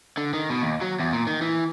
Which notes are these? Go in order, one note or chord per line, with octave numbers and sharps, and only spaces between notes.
D3
D#3
B2
D#2
F#3
E2
A#2
D#3
E3